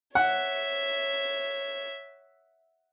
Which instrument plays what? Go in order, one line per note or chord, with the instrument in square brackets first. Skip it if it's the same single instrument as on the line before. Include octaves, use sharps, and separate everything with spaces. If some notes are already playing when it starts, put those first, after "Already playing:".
[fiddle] C#5 E5 [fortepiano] F#5